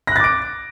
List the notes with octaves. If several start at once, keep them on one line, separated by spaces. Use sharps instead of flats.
D6 F#6 A6 A#6 D7